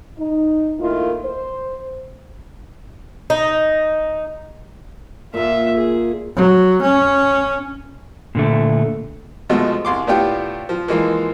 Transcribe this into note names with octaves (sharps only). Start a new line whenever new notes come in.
D#4
A2 D#3 A#3 E4 F4
C5
D#4
A#2 A#3 F4 E5
G#4
F#3
C#4
A#2 D3 A3
B2 F3 G#3 A3
C2 C6 D6
A2 B3 D4 F4 G4 G5
F3
E3 F3 G#3 A#3